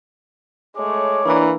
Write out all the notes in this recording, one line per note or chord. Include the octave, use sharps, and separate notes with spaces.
G#3 A3 C#5 D6
E3 A#3 D4 E4 D5 A#5